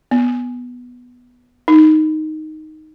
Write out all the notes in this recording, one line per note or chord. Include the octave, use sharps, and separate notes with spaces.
B3
D#4